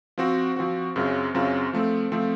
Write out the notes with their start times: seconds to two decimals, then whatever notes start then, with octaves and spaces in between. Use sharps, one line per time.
0.18 F3 C4 F#4
0.56 F3 C4 F#4
0.96 F#2 C#3 F#3 C4 F4
1.34 F#2 C#3 F#3 C4 F4
1.73 F3 A3 C4
2.12 F3 A3 C4